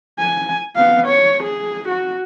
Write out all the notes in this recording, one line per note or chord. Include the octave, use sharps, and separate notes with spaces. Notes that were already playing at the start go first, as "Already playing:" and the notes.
G#5
B3 F5
C#5
G#4
F#4